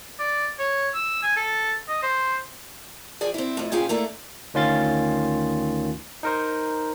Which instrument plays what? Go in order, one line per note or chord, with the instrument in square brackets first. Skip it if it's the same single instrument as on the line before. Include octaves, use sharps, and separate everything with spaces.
[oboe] D5
C#5
E6
G#5
A4
D#5
C5
[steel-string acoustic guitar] F3 G#4 D5 G5
C4 E4
F2 A2
A#2 C#4 F4 G#4 B4 G5
A3 A#3 D4 E4 A4
[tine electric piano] D2 D#3 C#4 F4 C6 A6
D#4 A#4 C5